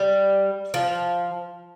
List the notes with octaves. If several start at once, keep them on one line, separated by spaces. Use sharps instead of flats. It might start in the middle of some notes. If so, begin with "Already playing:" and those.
Already playing: G3
F3